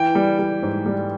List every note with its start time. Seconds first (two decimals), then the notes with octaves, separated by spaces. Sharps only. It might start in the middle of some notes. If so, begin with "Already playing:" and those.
Already playing: E3 G5
0.15 G3
0.39 G3
0.63 G#2
0.86 G3